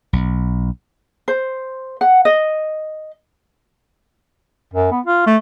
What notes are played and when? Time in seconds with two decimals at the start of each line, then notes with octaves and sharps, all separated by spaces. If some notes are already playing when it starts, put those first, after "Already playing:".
0.13 B1
1.28 C5
2.01 F#5
2.25 D#5
4.73 F#2
4.91 B3
5.06 F4
5.27 A3